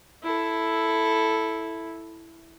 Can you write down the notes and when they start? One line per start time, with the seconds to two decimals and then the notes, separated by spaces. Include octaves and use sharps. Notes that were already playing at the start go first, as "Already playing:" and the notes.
0.23 E4 A4